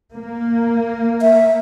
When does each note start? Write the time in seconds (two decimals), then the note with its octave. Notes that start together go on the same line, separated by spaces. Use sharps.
0.13 A#3
1.22 E5